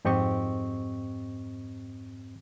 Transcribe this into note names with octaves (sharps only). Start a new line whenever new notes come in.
F2 G#2 C4 G4 D#5 C#6